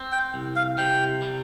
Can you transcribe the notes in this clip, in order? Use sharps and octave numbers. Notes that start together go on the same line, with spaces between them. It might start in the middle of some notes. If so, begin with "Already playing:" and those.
Already playing: C4
G5
C2
F5
C3 G5
G3